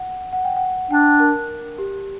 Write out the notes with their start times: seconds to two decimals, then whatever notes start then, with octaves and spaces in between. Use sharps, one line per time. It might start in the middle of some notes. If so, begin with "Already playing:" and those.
Already playing: F#5
0.33 F#5
0.45 G5
0.56 F#5
0.91 D4 G5
1.20 A#4
1.78 G4